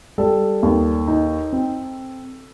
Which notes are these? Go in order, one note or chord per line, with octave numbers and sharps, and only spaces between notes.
G3 A4
D#2
D#4
C4